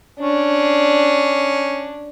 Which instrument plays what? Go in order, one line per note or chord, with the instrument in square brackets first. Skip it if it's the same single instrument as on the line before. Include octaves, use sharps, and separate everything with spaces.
[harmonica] C#4 [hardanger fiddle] D4